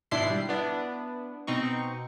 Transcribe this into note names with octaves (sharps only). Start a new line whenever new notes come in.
G#1 B2 D4 E4 C6 C7
G3
B3 D4 E4
B2 C4 D#4 C#6